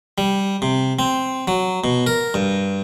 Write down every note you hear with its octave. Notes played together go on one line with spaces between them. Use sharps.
G3
C3
C4
F#3
B2
A#4
G2